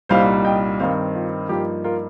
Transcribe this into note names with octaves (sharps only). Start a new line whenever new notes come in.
C2 A#2 G3 D#4 C5 F5
D#5 G5
G2 D#3 C4 C5 F5
F4
G2 F3 A#3 D#4 G4
F4 A#4